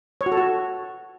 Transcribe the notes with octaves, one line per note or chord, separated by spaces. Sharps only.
C#5
F#4
A4
F#4